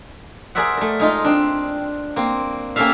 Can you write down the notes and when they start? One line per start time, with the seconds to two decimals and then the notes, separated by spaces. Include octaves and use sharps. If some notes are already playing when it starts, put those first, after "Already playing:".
0.55 G#4 A#4 C5 D5 E5 F#5
0.77 A3 A#4
1.00 G#3 D#4 F4
1.24 C4 D4
2.16 A#3 C4
2.76 A#3 C#4 G4 A4 E5 F5